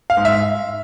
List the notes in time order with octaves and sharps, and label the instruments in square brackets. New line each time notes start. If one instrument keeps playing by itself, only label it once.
[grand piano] F5
G#2
E5